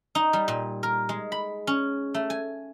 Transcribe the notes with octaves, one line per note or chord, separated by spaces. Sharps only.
D#4
G3
A#2
A#4
G#3
B5
C#4
A3
G#5